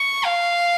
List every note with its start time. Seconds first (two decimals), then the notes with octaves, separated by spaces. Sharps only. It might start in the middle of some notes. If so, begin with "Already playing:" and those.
Already playing: C#6
0.25 F5